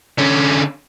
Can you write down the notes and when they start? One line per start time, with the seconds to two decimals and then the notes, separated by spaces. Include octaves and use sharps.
0.19 D3 C#4